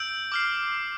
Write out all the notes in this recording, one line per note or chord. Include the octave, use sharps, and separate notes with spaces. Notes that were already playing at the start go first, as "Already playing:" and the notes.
Already playing: E6 G6 D7
D6 F6 C7